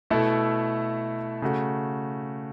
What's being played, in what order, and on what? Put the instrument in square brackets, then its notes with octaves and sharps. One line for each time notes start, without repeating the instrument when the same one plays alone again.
[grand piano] B2 A3 E4 A4
C#3 A3 F#4